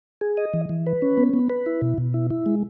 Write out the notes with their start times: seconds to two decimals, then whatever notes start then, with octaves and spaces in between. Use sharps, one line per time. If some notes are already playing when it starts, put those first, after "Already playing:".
0.21 G#4
0.37 D#5
0.54 E3
0.69 E3
0.86 B4
1.02 C#4
1.17 B3
1.33 B3
1.50 B4
1.66 E4
1.82 B2
1.98 B2
2.14 E4
2.30 E4
2.46 G#3